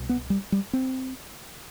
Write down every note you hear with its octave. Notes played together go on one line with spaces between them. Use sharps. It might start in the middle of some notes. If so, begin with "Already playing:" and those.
Already playing: C2 B2
B3
G3
G3
C4